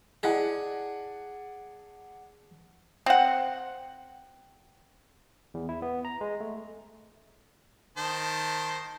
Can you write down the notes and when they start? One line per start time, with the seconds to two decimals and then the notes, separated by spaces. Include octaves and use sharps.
0.23 E4 G#4 D5 D#5 F#5 A5
3.06 C4 F#5
5.54 E2
5.69 E4
5.82 B3
6.05 A#5
6.21 G#3
6.40 A3
7.97 D#3 C5 A5